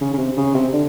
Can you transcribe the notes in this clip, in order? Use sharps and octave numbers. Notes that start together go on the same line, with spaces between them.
C#3
C#3
C3
C#3
C3
D3